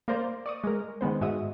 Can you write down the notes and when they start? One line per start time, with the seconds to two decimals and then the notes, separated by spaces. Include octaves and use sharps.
0.08 A#3 A#4 C5 D5
0.46 D5 C#6 D#6
0.64 G#3 A#4
1.01 D#3 G#3 B3 C5
1.21 G#2 G#3 F#4 E5 D#6